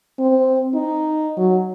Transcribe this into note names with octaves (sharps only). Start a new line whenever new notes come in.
C4
D#4
F#3